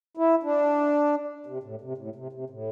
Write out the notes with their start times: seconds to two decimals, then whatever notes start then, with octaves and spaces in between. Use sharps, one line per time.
0.17 E4
0.43 D4
1.46 C3
1.63 A2
1.81 C3
1.98 A2
2.16 C3
2.33 C3
2.50 A2